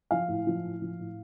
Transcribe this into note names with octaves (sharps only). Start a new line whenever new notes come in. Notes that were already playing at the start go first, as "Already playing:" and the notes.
F3 F5
A2
F3
A2
F3
A2